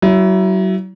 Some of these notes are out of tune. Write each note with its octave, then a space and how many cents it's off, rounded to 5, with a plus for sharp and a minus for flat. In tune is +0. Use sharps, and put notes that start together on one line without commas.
F#3 +35 E4 +10